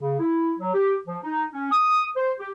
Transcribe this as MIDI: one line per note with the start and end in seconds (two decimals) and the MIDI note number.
0.01 0.19 49
0.20 0.53 64
0.59 0.71 54
0.74 0.95 67
1.07 1.17 53
1.23 1.46 63
1.53 1.67 61
1.72 2.07 87
2.16 2.31 72
2.39 2.50 67